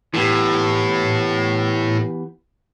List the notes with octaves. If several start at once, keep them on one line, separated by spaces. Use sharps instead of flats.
A2 E3 B3 G4